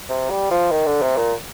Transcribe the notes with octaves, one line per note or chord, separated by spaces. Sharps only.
C3
G3
F3
D#3
D3
C3
A#2